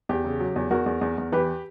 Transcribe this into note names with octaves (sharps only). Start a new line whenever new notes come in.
E2 G4
C#3
F#3
E2
E2 F#4 A#4
E2
E2
E2
E3 G4 B4